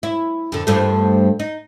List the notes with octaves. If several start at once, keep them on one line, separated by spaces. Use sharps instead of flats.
E4
F2 D3
G2 F3 A3
D#4